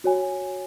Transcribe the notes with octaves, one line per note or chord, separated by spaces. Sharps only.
F#4 C#5 G#5